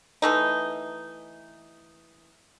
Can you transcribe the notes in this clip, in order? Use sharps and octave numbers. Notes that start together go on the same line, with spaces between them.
E3 A3 D#4